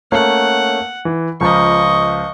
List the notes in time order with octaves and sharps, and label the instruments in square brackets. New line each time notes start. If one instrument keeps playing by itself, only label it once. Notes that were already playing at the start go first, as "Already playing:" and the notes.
[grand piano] A3 A#3 C#4 [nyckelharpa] F#5
[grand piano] E3
[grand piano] C#2 F3 A#5 [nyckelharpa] D#5 C#6